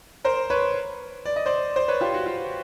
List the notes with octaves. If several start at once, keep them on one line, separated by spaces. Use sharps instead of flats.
A#4 C5
B4 C#5
D5
D#5
C5 D5
C5 D5
B4 C#5
F4 G4
F#4
F4